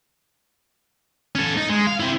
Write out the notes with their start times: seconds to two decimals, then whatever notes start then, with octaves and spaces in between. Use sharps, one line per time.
1.35 C#4 A4
1.57 D#4
1.70 G#3
1.87 F5
2.00 C4 E4